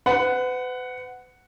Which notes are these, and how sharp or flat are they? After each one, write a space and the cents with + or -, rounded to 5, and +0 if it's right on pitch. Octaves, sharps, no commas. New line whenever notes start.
B4 +40 F#5 +0